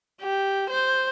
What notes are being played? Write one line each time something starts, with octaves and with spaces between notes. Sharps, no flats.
G4
C5